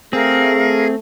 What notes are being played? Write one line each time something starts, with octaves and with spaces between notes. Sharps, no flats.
A3 C4 G#4 A#4 F5